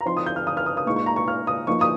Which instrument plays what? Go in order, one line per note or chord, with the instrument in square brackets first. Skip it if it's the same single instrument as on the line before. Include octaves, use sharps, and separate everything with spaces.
[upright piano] A#5
F3 C4 D#4 C6
D#6
G6
F6
D#6
F6
D#6
D#6
A#2 G#3 D#4 C#6
C#6
A#5
C#6
F6
D#6
F3 A#3 D#4 C#6
D#6